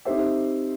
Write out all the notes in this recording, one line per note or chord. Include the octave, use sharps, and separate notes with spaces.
C4 D#4 G4 C5 E5